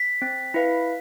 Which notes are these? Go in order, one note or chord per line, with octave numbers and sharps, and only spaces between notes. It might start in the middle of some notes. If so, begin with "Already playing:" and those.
Already playing: B6
C4
E4 B4 F5